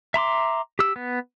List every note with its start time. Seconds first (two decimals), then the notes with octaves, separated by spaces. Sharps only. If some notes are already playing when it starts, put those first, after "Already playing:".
0.14 E5 A#5 C6 D6
0.79 G4 E6
0.96 B3